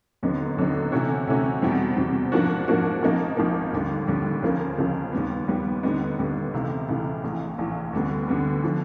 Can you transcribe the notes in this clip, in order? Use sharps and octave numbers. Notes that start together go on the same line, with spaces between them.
D#2 D3 F#3 B3 D#4
D#2 D3 F#3 B3 D#4
C3 E3 A3 C#4 F#4
C3 E3 A3 C#4 F#4
E2 B2 G3 C4
E2 B2 G3 C4
G#2 F3 A#3 D4 F#4
G#2 F3 A#3 D4 F#4
G#1 G#2 F3 A#3 D#4
G#1 G#2 F3 A#3 D#4
D#2 D3 G3
D#2 D3 G3
C#2 C#3 F3 A#3
C#2 C#3 F3 A#3
D#2 D#3 G3 B3
D#2 D#3 G3 B3
D#2 D3 G3 B3 D#4
D#2 D3 G3 B3 D#4
C#2 C3 E3 A3
C#2 C3 E3 A3
A#1 A2 E3
A#1 A2 E3
D2 D3 G3 B3
D2 D3 G3 B3
D3 F3